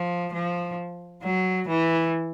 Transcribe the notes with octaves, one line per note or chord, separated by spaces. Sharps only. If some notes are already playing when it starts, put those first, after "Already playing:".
Already playing: F3
F3
F#3
E3